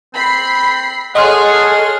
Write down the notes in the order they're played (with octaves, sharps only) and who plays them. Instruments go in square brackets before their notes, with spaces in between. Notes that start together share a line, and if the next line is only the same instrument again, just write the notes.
[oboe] C4 [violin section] B5 C7
[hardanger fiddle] G#4 [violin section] A4 C#5 [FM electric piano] D#5 C6 F6 [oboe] F#5